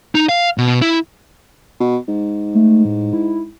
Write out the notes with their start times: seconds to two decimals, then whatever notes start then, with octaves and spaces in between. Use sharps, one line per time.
0.15 D#4
0.29 F5
0.58 B2
0.82 E4
1.80 B2
2.08 G#2
2.55 A3
2.85 A2
3.13 E4